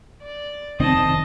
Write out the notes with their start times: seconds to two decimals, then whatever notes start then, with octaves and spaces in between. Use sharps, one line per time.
0.22 D5
0.80 F1 D#3 C4 D#5 A5